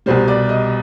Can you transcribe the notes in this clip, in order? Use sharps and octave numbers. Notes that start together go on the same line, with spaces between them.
C2 B2 G3 C5
D5
D#5